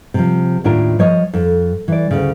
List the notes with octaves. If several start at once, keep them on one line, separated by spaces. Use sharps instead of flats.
C3 F3
D#2 A2 D4 F4 A#4
F3 C#5 D#5
F2
E3 D5
D2 C#3